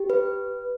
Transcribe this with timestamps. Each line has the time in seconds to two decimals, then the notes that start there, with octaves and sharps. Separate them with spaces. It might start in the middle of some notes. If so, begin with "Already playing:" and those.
Already playing: G4
0.10 B4